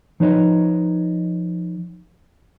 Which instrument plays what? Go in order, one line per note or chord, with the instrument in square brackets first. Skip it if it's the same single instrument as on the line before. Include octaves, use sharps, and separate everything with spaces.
[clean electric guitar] F3 D#4 B4 C#5 D#5